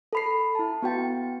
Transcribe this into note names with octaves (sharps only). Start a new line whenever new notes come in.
A4 B5 C7
E4 A5
B3 F#4 G5 A6